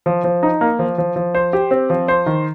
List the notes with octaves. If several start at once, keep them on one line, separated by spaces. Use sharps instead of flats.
F3
F3
D#4
A#3
F3
F3
F3
C5
G4
C4
F3
C5
D#3